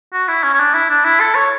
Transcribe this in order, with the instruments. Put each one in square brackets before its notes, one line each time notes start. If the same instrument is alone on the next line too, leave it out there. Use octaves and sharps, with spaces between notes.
[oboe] F#4
E4
C#4
C#4
D4
E4
D4
E4
A4
C#5